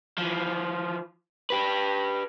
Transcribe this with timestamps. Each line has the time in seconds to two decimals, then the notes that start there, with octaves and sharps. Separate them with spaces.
0.18 E3 F3
1.50 G4 B4